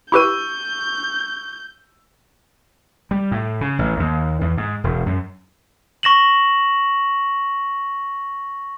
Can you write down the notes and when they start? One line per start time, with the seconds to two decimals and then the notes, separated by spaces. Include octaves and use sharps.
0.12 E4 G4 B4 C#6 E6 G6 D#7
3.11 G3
3.32 A2
3.61 C#3
3.79 A1
4.00 D#2
4.41 E2
4.58 G#2
4.84 E1
5.06 F#2
6.03 C#6 A#6 E7 F#7